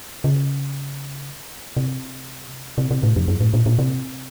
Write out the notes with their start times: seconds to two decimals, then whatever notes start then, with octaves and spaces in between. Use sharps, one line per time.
0.24 C#3
1.77 C3
2.78 C3
2.91 C3
3.03 A2
3.16 F2
3.28 F#2
3.41 A2
3.54 A#2
3.66 A#2
3.79 C3